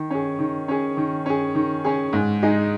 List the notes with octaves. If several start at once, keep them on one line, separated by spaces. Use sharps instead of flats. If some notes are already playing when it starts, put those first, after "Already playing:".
Already playing: D#3
C#4 G#4
D#3
C#4 G#4
D#3
C#4 G#4
D#3
C#4 G#4
G#2
G#3 D#4 G#4